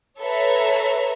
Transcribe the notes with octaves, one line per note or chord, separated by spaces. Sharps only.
A4 B4 C#5 E5 A5 A#5